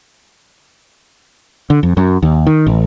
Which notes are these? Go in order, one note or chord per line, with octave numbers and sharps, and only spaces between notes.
D3
F2
F#2
D#2
D#3
A1